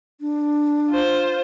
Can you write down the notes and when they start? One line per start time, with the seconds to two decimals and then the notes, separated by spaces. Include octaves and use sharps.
0.20 D4
0.90 F4 C5